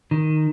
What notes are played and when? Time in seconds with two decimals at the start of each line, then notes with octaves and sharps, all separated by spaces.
0.11 D#3